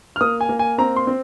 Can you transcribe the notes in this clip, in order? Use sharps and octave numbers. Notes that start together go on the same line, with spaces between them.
F6
A#3 D#6
G#5
A#3
G#5
C4 A#5
C6
C4